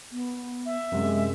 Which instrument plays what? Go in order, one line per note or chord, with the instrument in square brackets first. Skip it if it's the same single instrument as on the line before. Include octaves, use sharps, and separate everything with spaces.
[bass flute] B3
[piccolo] E5
[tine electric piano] F#2 C3 [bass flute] G#3